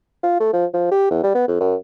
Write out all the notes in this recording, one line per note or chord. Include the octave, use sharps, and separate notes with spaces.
F4
A3
F3
F3
G4
E2
G3
B3
F2
F#2